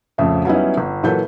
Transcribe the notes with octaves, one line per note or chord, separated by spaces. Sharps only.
A#1 F2 C#3 A3 E5
F#3 G3 B3 C#4 D#4 E4
G1
A#2 E3 F#3 A4 B4 G6